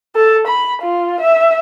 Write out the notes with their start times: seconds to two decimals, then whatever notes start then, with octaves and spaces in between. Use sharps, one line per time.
0.16 A4
0.47 B5
0.82 F4
1.20 E5